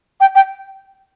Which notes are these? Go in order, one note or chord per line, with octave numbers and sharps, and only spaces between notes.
G5
G5